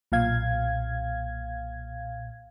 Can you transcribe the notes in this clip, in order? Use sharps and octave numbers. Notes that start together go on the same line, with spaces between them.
B1 A#2 F5 G#6